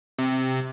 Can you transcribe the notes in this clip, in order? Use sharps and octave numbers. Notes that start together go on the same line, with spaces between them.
C3